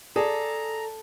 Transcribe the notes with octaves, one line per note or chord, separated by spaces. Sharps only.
G#4 A4 D5 A#5